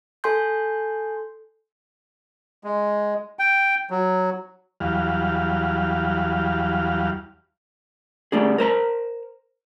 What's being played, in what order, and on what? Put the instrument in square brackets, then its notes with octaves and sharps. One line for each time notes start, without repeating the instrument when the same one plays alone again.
[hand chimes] A4 G#5 C6 G6
[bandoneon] G#3
G5
F#3
[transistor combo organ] E2 F#3 G3 F5
[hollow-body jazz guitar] G3 A3 D4 G#4
A#4 C5 A#5